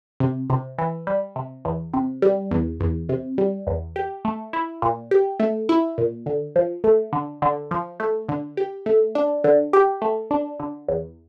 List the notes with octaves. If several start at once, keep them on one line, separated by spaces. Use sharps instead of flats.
C3
C3
E3
G3
C3
E2
C3
G3
E2
E2
C3
G3
E2
G4
A3
E4
A#2
G4
A3
E4
A#2
D3
F3
A3
D3
D3
F3
A3
D3
G4
A3
D4
D3
G4
A3
D4
D3
E2